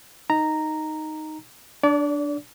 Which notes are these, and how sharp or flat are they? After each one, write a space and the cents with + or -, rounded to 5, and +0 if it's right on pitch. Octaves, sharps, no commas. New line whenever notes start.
D#4 +0 A#5 -5
D4 +0 D5 -35